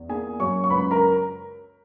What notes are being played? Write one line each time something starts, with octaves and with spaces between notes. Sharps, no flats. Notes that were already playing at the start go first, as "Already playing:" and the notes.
Already playing: E2
A#3 G#4 G#5
F#2 C#5 C#6
C#6
C#2 B4 B5
A#4 A#5